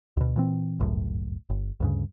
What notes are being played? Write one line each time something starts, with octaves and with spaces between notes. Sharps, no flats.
D2 B2
A#2 E3 C4
G1 C#2 F#2 A2
G1
D2 G2 C#3